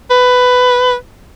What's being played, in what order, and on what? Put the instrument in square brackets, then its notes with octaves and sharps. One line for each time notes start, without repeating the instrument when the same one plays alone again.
[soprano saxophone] B4